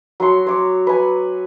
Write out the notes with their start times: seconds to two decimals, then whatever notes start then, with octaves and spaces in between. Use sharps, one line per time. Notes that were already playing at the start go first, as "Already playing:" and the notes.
0.20 F#3 C#5 C6
0.46 C#5 D6
0.87 B4 G#5